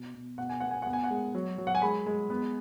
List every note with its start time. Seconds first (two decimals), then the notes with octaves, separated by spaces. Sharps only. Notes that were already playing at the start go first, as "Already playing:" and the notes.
Already playing: B2
0.14 B2
0.38 B2 F#5
0.50 G#5
0.60 B3 F#5
0.71 G#5
0.82 B3 F#5
0.93 G#5
1.04 F#5
1.11 G#3
1.35 F#3
1.58 F#3
1.67 F#5
1.75 G#5
1.82 G#3 B5
2.06 G#3
2.30 B3